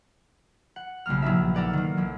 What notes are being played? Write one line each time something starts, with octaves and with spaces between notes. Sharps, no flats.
F#5
B1 C#3 G3 A#3 F6
A#1 F#3 B3 D#4 E5
A4 A#4 D5 F#5
D#3 A#3
B1 F#3